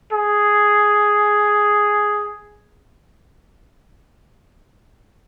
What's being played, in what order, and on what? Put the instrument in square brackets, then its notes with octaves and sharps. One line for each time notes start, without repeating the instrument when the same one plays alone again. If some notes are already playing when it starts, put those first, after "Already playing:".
[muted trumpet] G#4